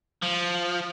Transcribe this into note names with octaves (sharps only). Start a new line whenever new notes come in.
F3